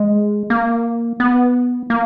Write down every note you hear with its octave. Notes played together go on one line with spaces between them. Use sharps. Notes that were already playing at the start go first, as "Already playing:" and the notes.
Already playing: G#3
A#3
B3
A#3